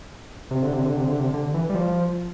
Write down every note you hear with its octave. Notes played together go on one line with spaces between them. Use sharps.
C3
D3
C3
D3
C3
D3
C3
D3
E3
G3
F3